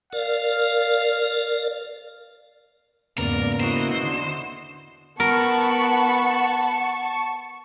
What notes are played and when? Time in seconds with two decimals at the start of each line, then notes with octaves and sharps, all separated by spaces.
0.13 A#4 D5 F5
3.18 E2 G#2 C#3 A#3 B3 A#4 D5
3.60 E4 F#4 C5 D#5
4.03 D3
5.20 B3 A#4 F#5 A5 B5 C#6